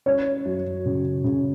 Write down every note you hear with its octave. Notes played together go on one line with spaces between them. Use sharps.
C#4 C#5
F#2
C#3
C#3